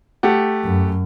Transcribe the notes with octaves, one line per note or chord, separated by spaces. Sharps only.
A3 G4 F#5
F#2